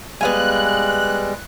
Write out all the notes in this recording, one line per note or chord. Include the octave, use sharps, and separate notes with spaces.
G3 G#3 B3 F5 G#5 F#6